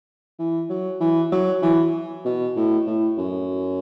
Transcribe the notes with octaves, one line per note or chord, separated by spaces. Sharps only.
E3
F#3
E3
F#3
E3
B2
A2
A2
F#2